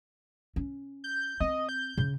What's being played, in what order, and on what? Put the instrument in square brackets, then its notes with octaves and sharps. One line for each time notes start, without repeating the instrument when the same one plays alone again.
[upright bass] C#4
[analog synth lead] G6
[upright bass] C4 [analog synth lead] D#5
[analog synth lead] G6
[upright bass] C#3